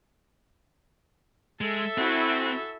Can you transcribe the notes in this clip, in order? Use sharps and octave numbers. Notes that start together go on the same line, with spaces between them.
G#3 A4 E5
C4 E4 F#4 G#5